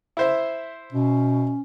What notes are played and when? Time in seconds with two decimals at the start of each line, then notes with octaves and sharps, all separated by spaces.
0.17 E4 C5 E5
0.92 B2 C#4